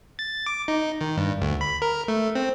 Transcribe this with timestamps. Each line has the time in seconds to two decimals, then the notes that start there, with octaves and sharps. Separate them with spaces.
0.19 A6
0.46 D6
0.68 D#4
1.01 D#3
1.17 G2
1.41 D2
1.61 B5
1.82 A#4
2.08 A3
2.35 C4